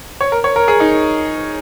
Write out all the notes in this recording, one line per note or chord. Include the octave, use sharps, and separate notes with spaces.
C#5
A#4
C#5
A#4
G#4
D#4